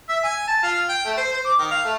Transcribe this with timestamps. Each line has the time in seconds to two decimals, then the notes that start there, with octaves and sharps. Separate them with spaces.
0.09 E5
0.24 G#5
0.48 A5
0.63 F4
0.89 G5
1.05 A3
1.17 C5
1.33 C5
1.45 D6
1.59 D#3
1.71 F5
1.85 A3